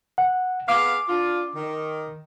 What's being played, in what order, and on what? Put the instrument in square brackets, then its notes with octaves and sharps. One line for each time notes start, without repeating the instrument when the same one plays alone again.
[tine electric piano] F#5
[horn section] B3 G#4 F5 [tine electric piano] D6
[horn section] D4 F4
D#3